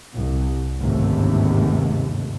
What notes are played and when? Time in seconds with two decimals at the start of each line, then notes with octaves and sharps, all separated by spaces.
0.14 C2
0.78 G1 D#2 G#2 C3 A3